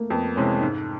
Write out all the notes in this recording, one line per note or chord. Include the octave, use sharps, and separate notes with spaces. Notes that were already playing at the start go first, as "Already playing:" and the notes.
Already playing: A3 A#3
F2 B3
C3 E3 G#3 C#4
G#2 D#4